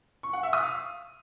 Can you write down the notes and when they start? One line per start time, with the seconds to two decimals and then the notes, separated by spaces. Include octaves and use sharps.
0.23 C#6
0.33 F#5
0.43 E5
0.53 D#6
0.63 F5